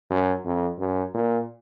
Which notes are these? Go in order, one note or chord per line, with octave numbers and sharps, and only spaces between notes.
F#2
F2
F#2
A#2